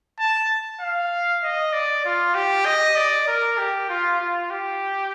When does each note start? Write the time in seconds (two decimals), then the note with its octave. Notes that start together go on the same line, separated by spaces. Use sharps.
0.19 A5
0.80 F5
1.43 D#5
1.73 D5
2.05 F4
2.35 G4
2.66 D#5
2.96 D5
3.28 A#4
3.58 G4
3.89 F4
4.21 F4
4.50 G4